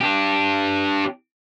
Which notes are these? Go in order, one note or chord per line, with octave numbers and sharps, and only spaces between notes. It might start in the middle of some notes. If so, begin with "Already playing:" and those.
D4 G4